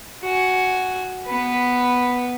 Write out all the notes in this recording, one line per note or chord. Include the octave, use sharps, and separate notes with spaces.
F#4 G#5
B3 B4